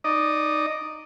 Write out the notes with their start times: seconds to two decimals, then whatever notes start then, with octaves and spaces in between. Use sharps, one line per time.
0.04 D#4 D5 D#5